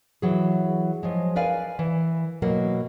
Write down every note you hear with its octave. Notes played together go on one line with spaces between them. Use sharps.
E3 F#3 G#4
F3 F#3 G#3
A#4 B4 D5 F5 G#5
E3
B2 F#3 A#3 A#4